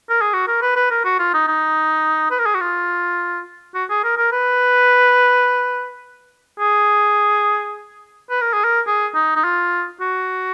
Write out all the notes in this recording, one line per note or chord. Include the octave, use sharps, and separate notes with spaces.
A#4
G#4
F#4
A#4
B4
B4
A#4
F#4
F4
D#4
D#4
B4
A#4
G#4
F#4
F4
F#4
G#4
A#4
A#4
B4
G#4
B4
A#4
G#4
A#4
G#4
D#4
D#4
F4
F#4